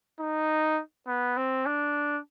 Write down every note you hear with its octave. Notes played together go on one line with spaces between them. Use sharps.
D#4
B3
C4
D4